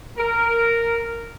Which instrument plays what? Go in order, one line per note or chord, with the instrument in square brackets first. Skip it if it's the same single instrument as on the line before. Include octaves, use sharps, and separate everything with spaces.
[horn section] A#4